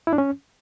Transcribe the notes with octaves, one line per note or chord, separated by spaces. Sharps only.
E4
D4
C#4